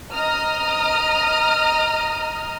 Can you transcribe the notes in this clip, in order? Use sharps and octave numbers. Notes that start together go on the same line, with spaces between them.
D#5 A#5 D#6 F6